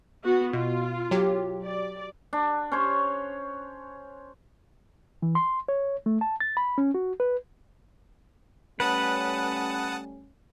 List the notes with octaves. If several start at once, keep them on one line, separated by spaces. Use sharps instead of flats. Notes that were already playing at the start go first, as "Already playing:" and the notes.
B3 F#4
B2 F4
F#3 G4
D5
D4
C#4 C5 C#5
E3
C6
C#5
A3
A5
A6
B5
C#4
F#4
B4
G3 A3 C#4 B4 F#5 A5 D#6